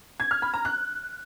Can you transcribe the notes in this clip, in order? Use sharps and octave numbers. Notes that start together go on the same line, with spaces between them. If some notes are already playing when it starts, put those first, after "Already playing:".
G#6
F6
B5
A#5
F#6